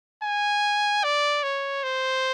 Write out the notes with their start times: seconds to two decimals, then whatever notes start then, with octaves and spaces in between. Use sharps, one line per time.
0.24 G#5
1.04 D5
1.43 C#5
1.83 C5